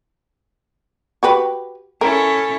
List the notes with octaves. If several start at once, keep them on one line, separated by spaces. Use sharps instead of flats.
F#4 G4 B4
C#4 E4 A4 A#4